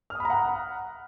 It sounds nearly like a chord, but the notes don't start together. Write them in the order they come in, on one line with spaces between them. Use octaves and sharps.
F6 D#6 B5 A#5 F#5